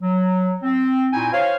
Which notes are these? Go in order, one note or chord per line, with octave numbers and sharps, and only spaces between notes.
F#3
C4
A#2 D#4 E4 F#4 G5 G#5
C5 C#5 F5